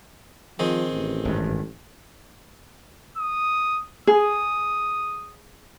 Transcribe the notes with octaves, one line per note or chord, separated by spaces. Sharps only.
D#3 F3 C4 G#4
A1
G#1 G2
D#6
G#4 D#6